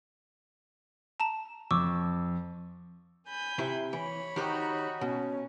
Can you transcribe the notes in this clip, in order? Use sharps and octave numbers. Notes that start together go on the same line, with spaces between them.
A5 A#5 E7
F2 C#6 D6 E6
G#5 B5 G6
C3 E4 C5
E3 C#5 B5
D#3 D#4 F#4 G4 C5
B2 C#4